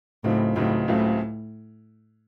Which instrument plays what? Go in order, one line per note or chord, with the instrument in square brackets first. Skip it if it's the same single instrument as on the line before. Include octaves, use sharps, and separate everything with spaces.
[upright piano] C#2 C#3 F#3 C4 D#4 [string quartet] A2
[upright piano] C#2 C#3 F#3 C4 D#4 [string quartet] A2
[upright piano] C#2 C#3 F#3 A3 C4 [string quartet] A2